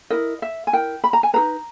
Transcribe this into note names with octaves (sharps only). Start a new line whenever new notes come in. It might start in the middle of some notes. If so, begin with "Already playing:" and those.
E4 A#4 D#5
E5
G#5
E4 A#4 G5
B5
A#5
G#5
D#4 G#4 B4 A#5